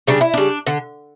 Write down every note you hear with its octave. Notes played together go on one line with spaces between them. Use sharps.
C#3 G3 D4
E4
C#3 G3 D4
D3